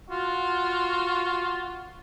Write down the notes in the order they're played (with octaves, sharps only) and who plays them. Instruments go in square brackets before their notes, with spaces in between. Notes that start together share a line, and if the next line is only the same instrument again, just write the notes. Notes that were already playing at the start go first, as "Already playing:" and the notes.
[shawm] F4 [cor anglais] F#4